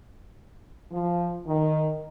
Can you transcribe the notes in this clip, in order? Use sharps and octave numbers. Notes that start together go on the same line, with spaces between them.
F3
D#3